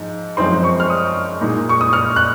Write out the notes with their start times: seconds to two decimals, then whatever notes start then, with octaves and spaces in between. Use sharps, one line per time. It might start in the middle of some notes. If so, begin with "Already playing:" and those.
Already playing: G#2 F3
0.37 F#2 F3 G#3 C4 D#4 C6
0.64 C#6
0.80 F6
0.90 D#6
1.41 A#2 G#3 D#4
1.69 C#6
1.81 D#6
1.93 F6
2.16 F#6